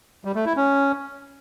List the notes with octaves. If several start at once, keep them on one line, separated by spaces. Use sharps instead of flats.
G3
A3
E4
C#4